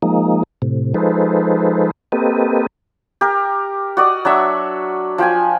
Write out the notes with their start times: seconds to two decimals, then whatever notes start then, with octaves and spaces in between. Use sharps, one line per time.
0.02 F3 G#3 A#3 D#4
0.62 A2 C3
0.94 F3 G#3 D#4 A4 B4 C5
2.12 A#3 C4 G4 A4 B4 D#5
3.21 G4 A#4
3.97 F#4 D5 D#5
4.25 F#3 D4 E5 C#6
5.18 F3 G5 G#5